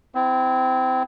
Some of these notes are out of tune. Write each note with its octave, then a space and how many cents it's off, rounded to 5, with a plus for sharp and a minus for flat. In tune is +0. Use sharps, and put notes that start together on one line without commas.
C4 -25 E4 +0